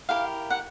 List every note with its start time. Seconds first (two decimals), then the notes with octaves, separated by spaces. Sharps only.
0.09 E4 G4 A#4 F5
0.50 F#5